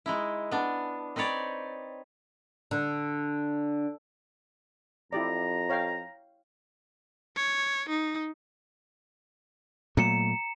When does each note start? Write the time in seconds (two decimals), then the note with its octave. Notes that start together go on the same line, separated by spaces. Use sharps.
0.06 G#3 D#4 E4
0.51 B3 D4
1.16 C4 D#4 B4 C#5 D5
2.71 D3
5.13 F2 E4 G4 D5 A#5
5.69 C#5 F5 G5
7.36 C#5
7.89 D#4
9.97 A#2 F#3 A3 A#5 C#7 E7